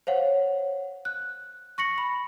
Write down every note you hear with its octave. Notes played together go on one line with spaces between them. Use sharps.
C5 C#5 F5 F#5
F#6
C#6 A#6 C#7 F#7
B5